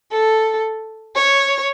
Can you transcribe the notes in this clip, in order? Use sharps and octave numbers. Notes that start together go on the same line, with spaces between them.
A4
C#5